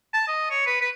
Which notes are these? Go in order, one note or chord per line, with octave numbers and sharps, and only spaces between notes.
A5
D#5
C#5
B4
B4